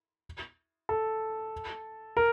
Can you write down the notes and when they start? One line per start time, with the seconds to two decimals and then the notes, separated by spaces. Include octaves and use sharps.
0.89 A4
2.17 A#4